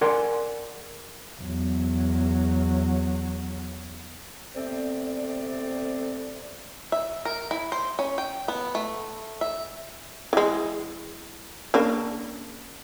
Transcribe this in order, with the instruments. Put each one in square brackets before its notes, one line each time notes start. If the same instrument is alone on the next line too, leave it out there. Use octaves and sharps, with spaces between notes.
[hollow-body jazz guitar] G#4 A#4 D5 F#5 G#5 C6
[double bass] E2 F#3
[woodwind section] C3 A3 B3 C4 D5
[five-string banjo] E5
A#4
E4
C5
C#4
G5
B3
A3
E5
[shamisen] E3 G#3
C#3 A#3 D4